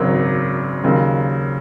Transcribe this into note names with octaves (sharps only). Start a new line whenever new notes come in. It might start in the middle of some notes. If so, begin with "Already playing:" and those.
Already playing: G#1 F#2 C#3 F#3
D#2 C#3 F#3